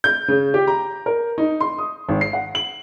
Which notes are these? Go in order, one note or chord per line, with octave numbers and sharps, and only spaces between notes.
G6
C#3
G4
A#5
A#4
D#4
C6
D#6
G#1
C7
F#5
F#7